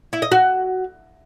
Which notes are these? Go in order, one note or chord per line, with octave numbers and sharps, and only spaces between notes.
E4
D#5
F#4